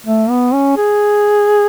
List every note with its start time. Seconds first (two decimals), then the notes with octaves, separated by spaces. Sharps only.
0.06 A3
0.30 B3
0.53 C#4
0.77 G#4